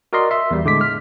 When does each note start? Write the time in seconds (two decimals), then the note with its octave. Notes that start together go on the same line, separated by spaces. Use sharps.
0.13 F#4 A#4 D5 D#5 C6
0.31 E5 C6
0.51 E2 G3
0.65 A2 D3 G#3 D6 B6
0.81 F6